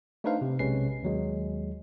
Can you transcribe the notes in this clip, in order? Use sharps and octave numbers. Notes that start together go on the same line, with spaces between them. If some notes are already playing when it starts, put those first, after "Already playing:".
A3 D4 D#4 B4 C5 F5
C3
B1 C3 G#3 C#4 B4 C7
D#2 F#3 G#3